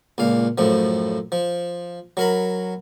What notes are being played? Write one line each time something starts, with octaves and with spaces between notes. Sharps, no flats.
C#2 A#2 F5
F#2 A2 F3
F3
F#3 A#4 B5